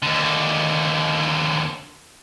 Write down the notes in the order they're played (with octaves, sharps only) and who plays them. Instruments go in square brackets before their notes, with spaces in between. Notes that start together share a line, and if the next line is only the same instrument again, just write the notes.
[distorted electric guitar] D#2 D3